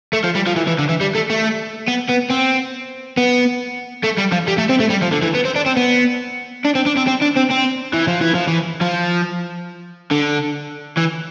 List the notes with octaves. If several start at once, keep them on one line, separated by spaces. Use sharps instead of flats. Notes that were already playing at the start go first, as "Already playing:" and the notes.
A3
F3
G3
F3
E3
E3
D3
E3
G3
A3
A3
B3
B3
C4
B3
A3
G3
F3
G3
A3
C4
A3
G3
F3
D3
E3
B3
C4
D4
C4
B3
D4
C4
D4
C4
C4
D4
C4
C4
E3
F3
E3
F3
E3
F3
D3
E3